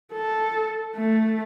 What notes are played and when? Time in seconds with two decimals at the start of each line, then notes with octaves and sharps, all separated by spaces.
0.13 A4
0.96 A3